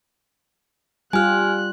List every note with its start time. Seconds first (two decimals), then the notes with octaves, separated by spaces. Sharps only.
1.13 G3 F4 G4 G#5 F6 F#6